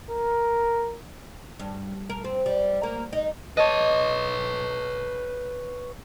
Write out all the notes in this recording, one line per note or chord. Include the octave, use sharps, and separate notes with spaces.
A#4
G2
A#4
C4
G3
A#3
D#4
B4 C#5 D#5 A5 D#6